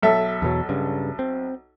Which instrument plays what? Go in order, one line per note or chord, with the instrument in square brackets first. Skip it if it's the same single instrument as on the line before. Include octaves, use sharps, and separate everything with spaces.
[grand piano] B1 A4 E5
[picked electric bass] E2 B2 F#3
G2 C#3
C4